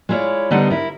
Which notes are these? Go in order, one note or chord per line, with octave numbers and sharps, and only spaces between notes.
G#3 B3 E4 F4 C#5 D5
D3 G3 B3 D#4 C5 F#5
E4 A#4